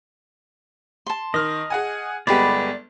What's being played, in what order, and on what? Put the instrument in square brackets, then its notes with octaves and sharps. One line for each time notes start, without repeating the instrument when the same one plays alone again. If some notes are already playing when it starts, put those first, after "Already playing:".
[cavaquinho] A5 C6
[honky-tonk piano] D#3 F6 [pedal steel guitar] D#5
[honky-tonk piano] G#4 F#5 G#5
[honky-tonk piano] G1 G#3 B3 [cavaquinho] G4 B5 [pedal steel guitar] D5